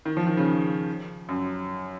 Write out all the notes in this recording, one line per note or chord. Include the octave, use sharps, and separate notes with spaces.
D#3
F3
D#3
C#3
F#2